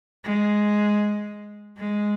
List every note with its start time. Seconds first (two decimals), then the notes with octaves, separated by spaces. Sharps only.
0.24 G#3
1.77 G#3